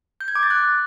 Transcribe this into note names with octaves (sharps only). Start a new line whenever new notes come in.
G6
G#6
D6
A6
F#6